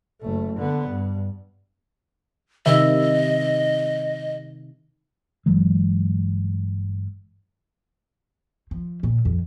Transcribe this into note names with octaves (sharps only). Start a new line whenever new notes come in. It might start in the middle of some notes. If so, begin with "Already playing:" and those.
F#1 A3
D3 B3
G2
C3 D#3 D#5 E5
G1 E3 F#3 G#3
F3
A#2
F2